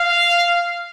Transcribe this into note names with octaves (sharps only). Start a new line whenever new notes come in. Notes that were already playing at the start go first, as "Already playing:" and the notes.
Already playing: F5